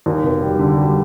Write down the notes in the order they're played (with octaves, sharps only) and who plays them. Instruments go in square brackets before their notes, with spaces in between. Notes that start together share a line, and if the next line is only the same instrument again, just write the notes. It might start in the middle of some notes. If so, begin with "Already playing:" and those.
[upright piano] D#2
F1
G3
D3
G3